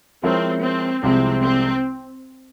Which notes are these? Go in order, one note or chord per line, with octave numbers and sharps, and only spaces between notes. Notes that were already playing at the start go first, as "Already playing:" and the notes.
F3 G#3 C4 E4 A#4 C#5
C4
C2 C3 F3 G#3 C4 E4
C4